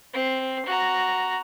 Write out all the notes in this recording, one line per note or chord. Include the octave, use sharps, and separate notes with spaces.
C4
F#4 A#5